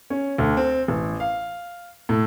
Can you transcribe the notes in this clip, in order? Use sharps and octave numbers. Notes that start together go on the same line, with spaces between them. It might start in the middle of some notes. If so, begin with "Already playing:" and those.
C#4
D2
C4
A1
F5
A2